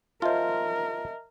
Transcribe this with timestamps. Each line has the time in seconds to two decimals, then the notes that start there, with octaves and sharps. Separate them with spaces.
0.22 F4 A#4 C5 D#5 E5 A5